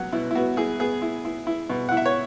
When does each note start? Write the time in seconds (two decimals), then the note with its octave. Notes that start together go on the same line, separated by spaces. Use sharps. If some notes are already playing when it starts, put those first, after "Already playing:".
Already playing: F#3 B3 F#5
0.12 B2 E4
0.31 E4
0.35 B3 F#4
0.57 E4 G#4
0.80 B3 G#4
1.02 E4
1.25 E4
1.47 E4
1.70 B2
1.89 E4 F#5
1.97 E5
2.06 C#5